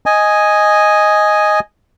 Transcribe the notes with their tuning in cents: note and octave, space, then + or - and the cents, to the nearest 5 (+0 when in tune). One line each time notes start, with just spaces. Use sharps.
D#5 +0 G#5 +0